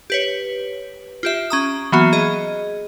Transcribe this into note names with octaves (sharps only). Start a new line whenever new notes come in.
G4 B4 C#5
F4 G4 E5
C#4 A#5 D#6
E3 F#3 A#3 B3 F#4
G#4 D#5